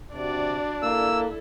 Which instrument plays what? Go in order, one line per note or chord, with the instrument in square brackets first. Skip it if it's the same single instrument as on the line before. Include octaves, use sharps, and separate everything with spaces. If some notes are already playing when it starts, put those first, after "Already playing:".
[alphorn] C3 [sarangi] D4 [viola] F#4 D5
[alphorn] A#3 [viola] E4 A4 [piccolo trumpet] E6